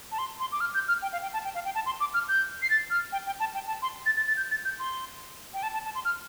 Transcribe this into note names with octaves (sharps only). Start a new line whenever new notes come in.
A5
C6
C6
D6
F6
G6
F6
G5
F5
G5
A5
G5
F5
G5
A5
C6
D6
F6
G6
C7
A6
F6
G5
G5
A5
G5
A5
C6
A6
A6
A6
G6
A6
G6
C6
G5
A5
A5
A5
C6
F6